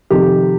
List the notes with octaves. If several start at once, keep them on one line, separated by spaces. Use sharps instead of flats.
F2 C3 D#3 G4